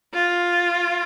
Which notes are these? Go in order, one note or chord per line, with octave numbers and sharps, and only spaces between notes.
F4